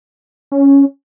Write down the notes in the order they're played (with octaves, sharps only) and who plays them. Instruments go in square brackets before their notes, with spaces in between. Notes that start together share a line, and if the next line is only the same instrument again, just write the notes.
[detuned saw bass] C#4